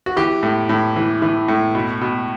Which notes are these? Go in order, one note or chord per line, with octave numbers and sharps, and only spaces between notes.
F#4
E3 G4
A2
A2
E3
E3
A2
B2
B2